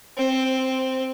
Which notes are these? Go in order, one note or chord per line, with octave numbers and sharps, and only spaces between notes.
C4